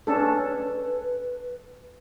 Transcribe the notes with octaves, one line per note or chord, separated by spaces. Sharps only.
C#4 D4 A4 B4